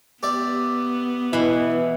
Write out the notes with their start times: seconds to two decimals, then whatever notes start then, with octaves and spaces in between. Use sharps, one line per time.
0.23 B3 G4 D5 E5
1.33 B2 E3 E4